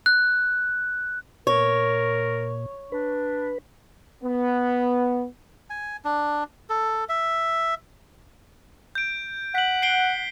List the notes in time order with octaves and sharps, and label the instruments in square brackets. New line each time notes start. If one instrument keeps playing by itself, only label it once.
[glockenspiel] F#6
[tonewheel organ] A#2 [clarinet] A#4 [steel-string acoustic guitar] C#5
[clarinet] D4 [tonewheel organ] B4
[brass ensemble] B3
[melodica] G#5
D4
A4
E5
[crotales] G6 D7
[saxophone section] F#5 [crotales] B6 F#7
[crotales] C7 D7 G7